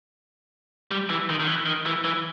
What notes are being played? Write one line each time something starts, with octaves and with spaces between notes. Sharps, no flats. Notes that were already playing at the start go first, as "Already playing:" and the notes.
G3
E3
D#3
D#3
E3
D#3
E3
E3